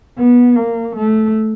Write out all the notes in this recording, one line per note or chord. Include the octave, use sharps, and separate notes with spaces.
B3
A#3
A3